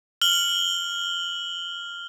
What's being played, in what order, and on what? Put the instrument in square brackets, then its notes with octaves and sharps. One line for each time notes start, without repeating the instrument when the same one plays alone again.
[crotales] F6 F#7 G7